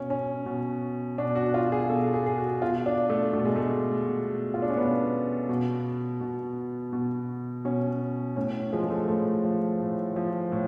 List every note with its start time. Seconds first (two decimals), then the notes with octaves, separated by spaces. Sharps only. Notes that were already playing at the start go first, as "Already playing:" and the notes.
Already playing: B2 C#4
0.10 C#4
0.46 B2
1.18 B2 D4
1.35 F#4
1.54 F4
1.72 G#4
1.90 B2 A4
2.14 G#4
2.26 G#4
2.38 F#4
2.62 B2 F4
2.86 D4
3.10 A3
3.33 B2 A3
3.45 G#3
3.55 A3
4.06 B2
4.54 F4
4.62 D4
4.70 C#4
4.77 B2 B3
5.49 B2
6.21 B2
6.93 B2
7.65 B2 C#4
8.36 A2 C#4
8.73 F3 G#3
8.90 A3
9.08 A2 A3
9.44 F3
9.80 A2
10.16 F3
10.52 A2